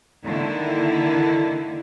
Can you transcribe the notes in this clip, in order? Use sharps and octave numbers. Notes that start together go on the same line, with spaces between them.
D3 D#3 A#3 E4